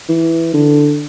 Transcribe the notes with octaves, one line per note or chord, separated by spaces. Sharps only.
E3
D3